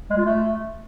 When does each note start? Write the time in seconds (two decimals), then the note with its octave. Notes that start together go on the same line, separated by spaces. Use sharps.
0.10 G#3
0.18 F4
0.26 A3